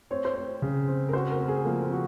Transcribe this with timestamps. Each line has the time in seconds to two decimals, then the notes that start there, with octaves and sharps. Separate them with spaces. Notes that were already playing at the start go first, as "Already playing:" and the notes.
0.11 C4 C#5
0.25 C5
0.36 C4 C#5
0.62 C#3
0.88 C4
1.09 A#4
1.13 F#4 C5
1.31 A#4
1.40 C4
1.48 G#4
1.65 F3 A#3
1.82 C4
1.91 F#4